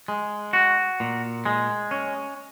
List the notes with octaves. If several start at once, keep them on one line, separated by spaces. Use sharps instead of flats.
G#3
F#4
A#2
G#3
C#4